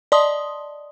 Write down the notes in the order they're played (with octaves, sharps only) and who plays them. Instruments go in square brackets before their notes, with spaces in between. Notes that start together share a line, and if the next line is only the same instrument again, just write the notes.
[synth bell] D5 D#5 A5 C6 D#6